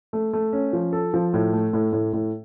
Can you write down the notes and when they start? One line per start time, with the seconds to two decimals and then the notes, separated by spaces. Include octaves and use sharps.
0.13 A3
0.33 A3
0.53 C#4
0.73 F3
0.93 A4
1.14 F3
1.34 A2
1.53 A3
1.73 A2
1.93 A2
2.13 A2